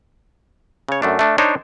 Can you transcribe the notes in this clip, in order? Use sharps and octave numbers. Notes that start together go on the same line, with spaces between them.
C#3 C#5
F#2 A3 D4
A3 D4
D4 D#4 C5 C#5